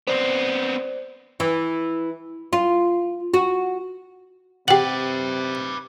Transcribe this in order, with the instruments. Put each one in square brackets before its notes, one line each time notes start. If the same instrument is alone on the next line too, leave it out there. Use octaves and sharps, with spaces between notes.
[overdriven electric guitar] B3 C4 [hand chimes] C5 D5
[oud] E3
F4
F#4
[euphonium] C3 [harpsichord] G4 F#5 [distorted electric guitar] B4 D5 [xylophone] G5 F#7